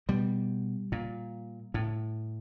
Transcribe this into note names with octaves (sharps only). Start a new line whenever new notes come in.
B2 G3
A#2
A2